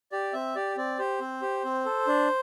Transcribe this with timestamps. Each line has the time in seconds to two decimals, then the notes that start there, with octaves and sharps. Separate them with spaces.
0.12 G4 D5
0.33 C4 E5
0.55 G4 D5
0.77 C4 D5
0.99 G4 C5
1.20 C4
1.42 G4
1.65 C4
1.85 A4
2.07 D4